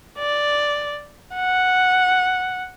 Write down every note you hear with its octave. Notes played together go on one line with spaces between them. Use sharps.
D5
F#5